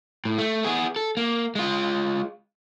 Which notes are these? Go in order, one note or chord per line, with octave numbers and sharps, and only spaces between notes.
A2
A3
B3 G#4
A4
A#3
G#3 F4